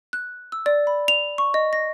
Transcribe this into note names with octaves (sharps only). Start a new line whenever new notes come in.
F#6
E6
D5
B5
F7
C#6
D#5
A#6